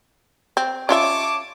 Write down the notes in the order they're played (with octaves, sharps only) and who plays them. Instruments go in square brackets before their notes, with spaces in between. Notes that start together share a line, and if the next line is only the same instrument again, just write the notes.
[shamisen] C4
[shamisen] C#4 F4 E5 [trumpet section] C#5 A5 D6